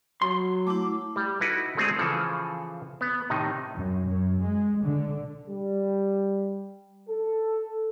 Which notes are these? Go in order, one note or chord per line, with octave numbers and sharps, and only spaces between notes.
F#3 C6
A3 E4 D6
G3
D#4 E4 F#4 A4 B4
G#3 A3 C4 D4 F#4 G#4
C#3 E3 F3 A4
B3
A2 C3 D#3 D#4
F#2
F#2
G#3
D3
G3
A4